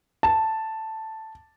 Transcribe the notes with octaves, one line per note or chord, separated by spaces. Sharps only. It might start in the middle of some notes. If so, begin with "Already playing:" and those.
A5